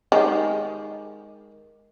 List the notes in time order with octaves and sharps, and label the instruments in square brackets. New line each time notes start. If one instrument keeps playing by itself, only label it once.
[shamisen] D#3 G#3 G4